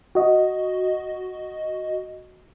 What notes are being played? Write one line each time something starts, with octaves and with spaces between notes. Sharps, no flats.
F#4 D#5